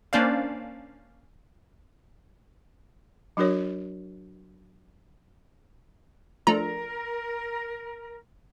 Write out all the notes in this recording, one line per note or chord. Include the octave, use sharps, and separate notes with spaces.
A#3 C#4 D4 C5 D5 F5
F#3 D4 F#4 A#4 C#5
F3 A3 D4 A#4 A#5